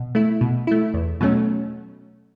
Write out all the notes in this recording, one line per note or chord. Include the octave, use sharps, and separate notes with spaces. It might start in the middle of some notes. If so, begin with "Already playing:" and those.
Already playing: B2
A3 E4
B2
A3 E4
E2
B2 F#3 A3 C#4